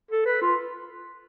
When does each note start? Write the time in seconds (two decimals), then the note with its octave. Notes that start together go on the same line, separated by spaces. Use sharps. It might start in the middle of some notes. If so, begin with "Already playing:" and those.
0.11 A4
0.26 B4
0.42 F4